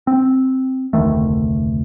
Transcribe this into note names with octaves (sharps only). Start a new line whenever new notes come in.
C4
F1 D2 D#3 A3